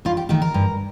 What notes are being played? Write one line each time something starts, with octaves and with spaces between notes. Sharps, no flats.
G2 F4
G4
D#3 A3 G4
A#4
G2